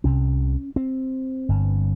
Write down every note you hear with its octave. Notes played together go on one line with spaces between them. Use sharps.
C2 C3 C#4
C4
G1 G2